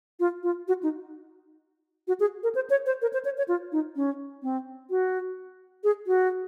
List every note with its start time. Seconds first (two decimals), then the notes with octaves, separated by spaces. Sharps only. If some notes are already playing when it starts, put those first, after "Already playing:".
0.20 F4
0.43 F4
0.68 F#4
0.83 D#4
2.08 F#4
2.20 G#4
2.43 A#4
2.55 C5
2.70 C#5
2.86 C5
3.02 A#4
3.13 C5
3.25 C#5
3.38 C#5
3.48 F4
3.72 D#4
3.96 C#4
4.43 C4
4.90 F#4
5.84 G#4
6.07 F#4